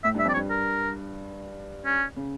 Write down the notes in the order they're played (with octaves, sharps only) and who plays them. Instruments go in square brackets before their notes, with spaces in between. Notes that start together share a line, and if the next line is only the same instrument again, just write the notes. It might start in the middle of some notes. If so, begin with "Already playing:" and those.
[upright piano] A2 [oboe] E5
[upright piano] G2 [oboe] E5
[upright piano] F2 [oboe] D5
[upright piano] G2 [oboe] C#5
[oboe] A#4
C#4
[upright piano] C#3